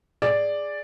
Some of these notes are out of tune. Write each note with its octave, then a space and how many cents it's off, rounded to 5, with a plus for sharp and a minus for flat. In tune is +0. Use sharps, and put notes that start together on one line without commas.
G#4 -5 D5 +0